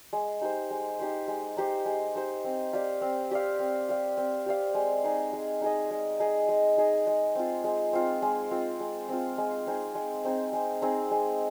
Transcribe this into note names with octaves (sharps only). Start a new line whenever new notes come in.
G#3
D#4 G4 C5
G#3
D#4 G4 C5
G#3
D#4 G4 C5
G#3
D#4 G4 C5
C4
G4 D5 F5
C4
G4 D5 F5
C4
G4 D5 F5
C4
G4 D5 F5
G#3
D#4 G#4 D#5
G#3
D#4 G#4 D#5
G#3
D#4 G#4 D#5
G#3
D#4 G#4 D#5
G#3
C4 F4
G#3
C4 F4
G#3
C4 F4
G#3
C4 F4
G#3
C4 D#4 G#4
G#3
C4 D#4 G#4
G#3
C4 D#4 G#4
G#3